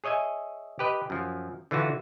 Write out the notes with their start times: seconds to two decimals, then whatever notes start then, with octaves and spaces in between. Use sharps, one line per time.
0.04 G#4 C#5 D#5 E5 G#5
0.79 G4 B4 D#5
1.10 F#2 F3
1.71 D3 E3 F4 F#4